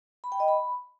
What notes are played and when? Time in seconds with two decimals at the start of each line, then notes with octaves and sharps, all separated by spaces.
0.24 B5
0.32 G5
0.40 D#5
0.48 B5